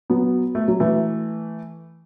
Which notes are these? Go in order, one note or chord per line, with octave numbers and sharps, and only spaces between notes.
F#3 B3
A3
F#3
E3 A3